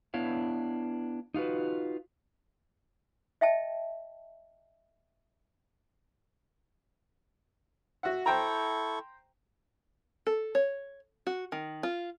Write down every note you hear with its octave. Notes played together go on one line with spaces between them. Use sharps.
B3 D4 E4 C#5 F5
D#4 F4 F#4 B4
D#5 E5 G5 A5
F#4 E5 F#5
E4 A4 C5 G5 A#5 C#6
A4
C#5
F#4
D#3
F4